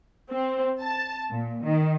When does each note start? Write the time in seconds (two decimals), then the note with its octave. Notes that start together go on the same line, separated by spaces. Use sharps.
0.31 C4
0.80 A5
1.30 A#2
1.64 D#3